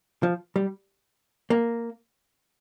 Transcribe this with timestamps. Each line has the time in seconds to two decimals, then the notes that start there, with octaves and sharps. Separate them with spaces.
0.23 F3
0.56 G3
1.50 A#3